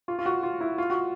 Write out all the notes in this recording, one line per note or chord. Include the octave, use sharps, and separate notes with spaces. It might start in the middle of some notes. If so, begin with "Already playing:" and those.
F4
F4
F#4
F4
E4
F4
F#4